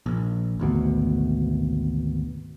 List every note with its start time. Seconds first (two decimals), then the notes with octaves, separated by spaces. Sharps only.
0.06 A#1
0.59 G#1 D2 B2